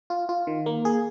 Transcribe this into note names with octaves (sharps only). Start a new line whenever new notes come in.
F4
F4
D#3
A#3
G#4